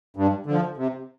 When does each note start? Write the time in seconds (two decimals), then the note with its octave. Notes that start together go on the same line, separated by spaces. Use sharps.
0.17 G2
0.46 D3 F3
0.77 C3